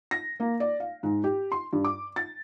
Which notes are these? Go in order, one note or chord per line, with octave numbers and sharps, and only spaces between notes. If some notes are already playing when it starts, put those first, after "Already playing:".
A#6
A#3
D5
F5
G#2
G4
C6
G2
D6
A6